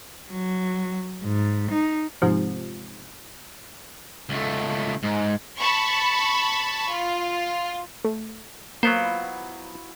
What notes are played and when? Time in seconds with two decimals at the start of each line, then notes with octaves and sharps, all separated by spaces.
0.31 F#3
1.24 G#2
1.71 D#4
2.22 G#2 C3 F3
4.29 C#2 A3
5.03 G#2
5.60 A5 B5 C#6
6.90 F4
8.05 A3
8.83 F#3 A#3 B3 F4 C5 B5
9.04 E4 F#4